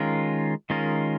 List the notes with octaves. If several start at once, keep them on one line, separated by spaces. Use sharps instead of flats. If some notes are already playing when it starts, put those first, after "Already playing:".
Already playing: D#3 G#3 C#4 F4 A#4
D#3 G#3 C#4 F4 A#4